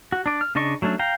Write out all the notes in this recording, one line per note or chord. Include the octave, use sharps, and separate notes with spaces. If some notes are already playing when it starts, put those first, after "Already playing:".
F#4
D4 D5
F6
C#3 D4 D5 D#5 C#6
F#3 A3 C#4 D4
F5 G5 A#5